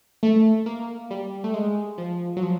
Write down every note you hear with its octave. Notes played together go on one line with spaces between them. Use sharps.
A3
A#3
G3
A3
G#3
F3
F#3
F3